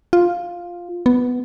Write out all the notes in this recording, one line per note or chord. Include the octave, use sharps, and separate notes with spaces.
F4
B3